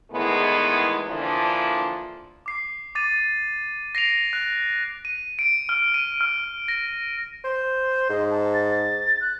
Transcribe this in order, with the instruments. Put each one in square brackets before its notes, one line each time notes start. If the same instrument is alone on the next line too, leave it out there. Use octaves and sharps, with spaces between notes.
[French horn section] E2 A2 D#3 G#3 B3
D3 E3 F3 A#3 D4
[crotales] D6 C7
D6 A6 D#7
A#6 C7 D7 F7
F#6
D#7
D7
F6
D#7
F6
A#6
[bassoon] C5
[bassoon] G#2 [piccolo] D#5
[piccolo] A5
A6
F#6